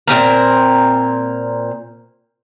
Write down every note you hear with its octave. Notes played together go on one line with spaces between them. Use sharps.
A#2 F3 C4 A#4